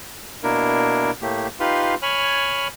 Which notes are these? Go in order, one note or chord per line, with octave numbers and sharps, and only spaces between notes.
B2 A#3 D4 E4 A#4
A2 A3 A#3 G4
D#4 F4 G4 B4 F5 C6
C#5 G#5 B5 F6